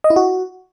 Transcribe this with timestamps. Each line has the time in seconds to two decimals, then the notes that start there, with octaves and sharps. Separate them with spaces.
0.04 D#5
0.10 E4
0.16 F#4